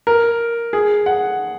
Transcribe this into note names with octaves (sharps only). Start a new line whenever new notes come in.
A#4
G#4
F#5